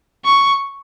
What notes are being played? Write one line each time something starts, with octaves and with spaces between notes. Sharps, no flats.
C#6